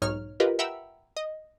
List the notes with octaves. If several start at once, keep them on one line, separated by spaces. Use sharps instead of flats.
B1 G#2 D#4 C#5 F6
F4 G4 A#4 B4 D#5
E5 F#5 G5 A#5 B5 E6
D#5